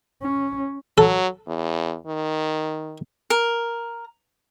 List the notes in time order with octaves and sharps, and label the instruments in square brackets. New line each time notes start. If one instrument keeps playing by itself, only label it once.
[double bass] C#4
[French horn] F#3 [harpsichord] A4
[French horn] E2
D#3
[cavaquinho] A#4